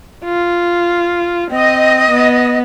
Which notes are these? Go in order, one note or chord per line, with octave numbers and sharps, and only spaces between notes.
F4
C4 D#5
B3